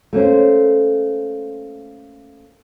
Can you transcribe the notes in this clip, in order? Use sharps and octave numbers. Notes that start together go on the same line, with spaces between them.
A3 A#3 C#4 C5